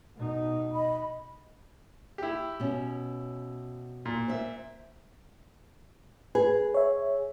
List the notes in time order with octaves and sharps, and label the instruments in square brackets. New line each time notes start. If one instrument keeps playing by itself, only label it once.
[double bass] B2 D#4
[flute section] D#5 B5
[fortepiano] E4 G4
[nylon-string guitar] B2 C#4
[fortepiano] A#2
[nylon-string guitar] C5 E5
[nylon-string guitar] G#4 [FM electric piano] B4
[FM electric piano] C#5 E5